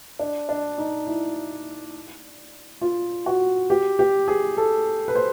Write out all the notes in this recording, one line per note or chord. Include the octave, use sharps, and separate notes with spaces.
D4
D4
D#4
E4
F4
F#4
G4
G4
G#4
A4
B4
C5